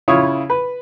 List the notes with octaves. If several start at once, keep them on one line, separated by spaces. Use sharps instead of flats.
C#3 E4 F4 C#5 D#6
B4